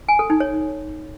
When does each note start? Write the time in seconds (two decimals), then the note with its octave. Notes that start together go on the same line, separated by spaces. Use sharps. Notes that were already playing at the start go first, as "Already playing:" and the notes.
0.08 G#5
0.19 A4
0.30 D#4
0.40 C#5